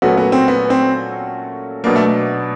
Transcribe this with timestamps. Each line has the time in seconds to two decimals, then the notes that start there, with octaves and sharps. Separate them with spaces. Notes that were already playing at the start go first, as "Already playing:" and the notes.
0.02 A#2 F#3 A3 B3 C#4 F#4
0.17 B3
0.32 C4
0.48 B3
0.70 C4
1.84 B2 F#3 A#3 B3 D4
1.96 A3